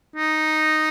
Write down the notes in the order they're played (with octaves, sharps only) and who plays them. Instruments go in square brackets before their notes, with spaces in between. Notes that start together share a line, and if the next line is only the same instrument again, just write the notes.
[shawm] D#4